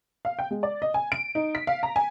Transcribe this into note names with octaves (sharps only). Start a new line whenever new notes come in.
F5
G5
G#3
D5
D#5
G#5
D7
D#4
B6
F5
A#5
G#5